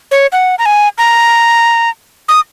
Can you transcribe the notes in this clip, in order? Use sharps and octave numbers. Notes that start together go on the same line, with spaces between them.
C#5
F#5
A#5
G#5
A#5
D#6